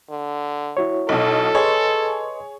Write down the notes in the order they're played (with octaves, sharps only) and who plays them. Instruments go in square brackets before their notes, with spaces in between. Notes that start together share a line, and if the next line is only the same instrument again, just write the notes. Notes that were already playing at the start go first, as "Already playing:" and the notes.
[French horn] D3
[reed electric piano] E4 F#4 C#5
[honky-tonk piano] B1 B2 [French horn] A4
[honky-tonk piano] G#4 C#5 [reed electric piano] B4 D#5 C6